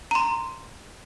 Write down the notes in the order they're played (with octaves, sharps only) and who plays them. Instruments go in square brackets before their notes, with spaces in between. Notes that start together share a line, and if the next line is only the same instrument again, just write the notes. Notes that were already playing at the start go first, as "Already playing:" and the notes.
[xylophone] A#5 C6